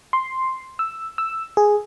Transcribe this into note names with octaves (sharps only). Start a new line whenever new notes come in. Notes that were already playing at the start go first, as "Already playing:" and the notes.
C6
E6
E6
G#4